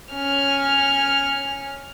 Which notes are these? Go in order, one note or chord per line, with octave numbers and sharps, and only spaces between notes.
C#4 F6